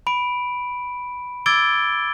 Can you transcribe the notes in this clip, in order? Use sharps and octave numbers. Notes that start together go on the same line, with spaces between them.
B5 D7
D6 E6 G#6 A6 D7 G7